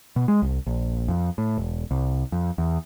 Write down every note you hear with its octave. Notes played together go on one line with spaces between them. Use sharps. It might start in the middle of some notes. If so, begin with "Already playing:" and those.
B2
G#3
C2
A#1
F2
A2
E1
C2
F2
E2